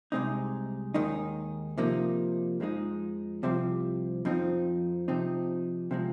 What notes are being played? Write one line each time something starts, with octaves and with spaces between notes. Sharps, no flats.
C2 C3 G#3 C4 D#4
D#2 D#3 G#3 D#4
C3 F3 A#3 D#4
F2 F3 G#3 D#4
C2 C3 F3 C4
F2 F3 C4 D#4
C3 F3 C4 D#4
C3 F3 G#3